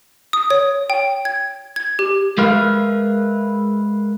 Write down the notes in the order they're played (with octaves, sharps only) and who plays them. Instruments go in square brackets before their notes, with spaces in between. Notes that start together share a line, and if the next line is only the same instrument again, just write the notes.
[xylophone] D#6
C#5
G5
G#6
G#6
G4
[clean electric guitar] G#3 A#4 B4 E5 F5